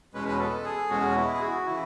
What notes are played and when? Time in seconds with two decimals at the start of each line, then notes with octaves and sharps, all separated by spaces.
0.14 E2 B2 G#3 C#4 B4
0.28 B4
0.39 A4
0.64 G#4
0.89 E2 B2 G#3 C#4 F#4
1.15 E4
1.34 G#4
1.40 F#4
1.66 C#3 E3 E4